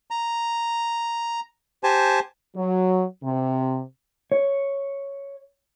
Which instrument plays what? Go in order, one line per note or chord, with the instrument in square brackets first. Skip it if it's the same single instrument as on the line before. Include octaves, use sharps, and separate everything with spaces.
[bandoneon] A#5
G4 C5 G#5 A5
[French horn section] F#3
C3
[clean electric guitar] C#5